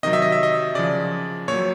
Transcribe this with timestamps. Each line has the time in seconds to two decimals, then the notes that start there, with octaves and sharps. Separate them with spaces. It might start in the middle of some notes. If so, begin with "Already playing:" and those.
0.03 C3 D#3 F#3 D#5
0.13 E5
0.22 D#5
0.32 E5
0.43 D#5
0.75 C#3 F3 D5
1.48 A#2 C#5
1.54 F#3